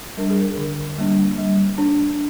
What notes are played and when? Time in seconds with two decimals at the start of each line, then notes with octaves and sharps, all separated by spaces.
0.17 G3 D4 A#4
0.30 G#4
0.41 A#4
0.58 D3
0.98 G3 A#3 D4
1.38 G3
1.78 D4